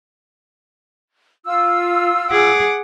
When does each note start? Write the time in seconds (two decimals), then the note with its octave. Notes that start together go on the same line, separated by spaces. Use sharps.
1.46 F4 E6
2.31 G#4 F#5 D6